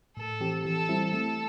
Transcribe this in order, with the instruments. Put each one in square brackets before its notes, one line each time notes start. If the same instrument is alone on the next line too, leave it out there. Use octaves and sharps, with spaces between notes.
[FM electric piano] A2 [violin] A4
[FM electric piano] E3 C4 G4
[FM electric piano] E3 [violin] A4
[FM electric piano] G3 C4 E4
[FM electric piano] A3 [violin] A4